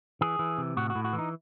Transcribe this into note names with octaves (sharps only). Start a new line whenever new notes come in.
E3 G#4
E3
C3
A2 F#4
F#4
A2
F#4
E3
D#4